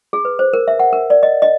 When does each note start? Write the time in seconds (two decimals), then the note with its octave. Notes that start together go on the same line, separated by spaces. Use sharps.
0.13 G#4
0.25 B4
0.39 C5
0.53 A#4
0.68 E5
0.80 F#5
0.93 A#4
1.10 D5
1.23 D#5
1.42 D#5